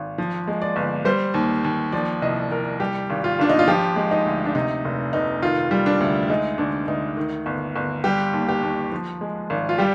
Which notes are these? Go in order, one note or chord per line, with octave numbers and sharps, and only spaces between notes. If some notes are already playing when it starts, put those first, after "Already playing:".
Already playing: G#1
F3
G#3
D5
G1
G3 C5
D#2
D#2
F3 D5
C2 D#5
C2 A#4
G3 G4
G#1
F4
G#1 D4
D#4
F4
F3 G4
G#3
D#4
D2
D4
C3 D#4
F1
F1 D#4
D#3 F4
G3
D4
D2
G#3 D#4
D2 D4
D2 D#4
D#3
G1
G1
G3 G4
D#2
G4
D#2
F3
G#3
G#1
F4
G3 G4